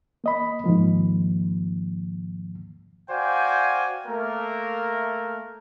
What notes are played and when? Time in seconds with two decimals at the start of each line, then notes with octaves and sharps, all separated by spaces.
0.24 A#3 D#5 B5
0.64 G#2 D#3 F3 A#3
3.10 F#4 C5 D5 F5 G5 G#5
4.07 A3 A#3 A#4